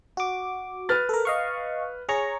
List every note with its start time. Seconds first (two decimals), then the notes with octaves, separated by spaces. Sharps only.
0.17 F#4 D6
0.89 B4 F6 A6
1.09 A4 A#4
1.25 D#5 F5 C#6
2.09 G#4 C#5 A#5 C#6